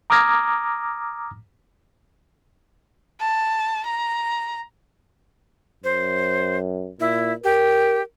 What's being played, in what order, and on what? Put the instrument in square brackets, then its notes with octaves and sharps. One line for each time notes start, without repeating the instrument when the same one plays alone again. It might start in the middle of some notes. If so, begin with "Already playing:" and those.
[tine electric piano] A#5 D6 D#6 F6 G#6 A#6
[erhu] A5
A#5
[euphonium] F#2 [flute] C5
[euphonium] A#2 [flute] E4
[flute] G4 [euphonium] A#4